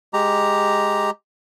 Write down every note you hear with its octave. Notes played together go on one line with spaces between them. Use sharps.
G#3 G4 A#5